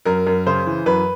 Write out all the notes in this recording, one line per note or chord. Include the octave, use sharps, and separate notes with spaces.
F#2 A#4
F#2
C#3 C5
E3
F#2 B4